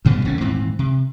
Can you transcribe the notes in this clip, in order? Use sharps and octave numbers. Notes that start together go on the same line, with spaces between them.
D2 G2 B2 G3
F1 D#2 A2 C#4
D#1 G#2 E3 C4
C3